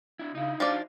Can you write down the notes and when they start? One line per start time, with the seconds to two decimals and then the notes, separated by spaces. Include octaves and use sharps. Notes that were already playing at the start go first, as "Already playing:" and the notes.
0.19 D4 E4
0.35 C#3 D#4 E4
0.60 F3 D4 D#4 F4 F#4 D5 F5